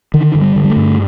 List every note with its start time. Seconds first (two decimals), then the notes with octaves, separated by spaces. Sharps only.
0.14 D3 D#3
0.35 G2
0.41 G3
0.56 D3
0.64 G3
0.70 A3
0.76 G2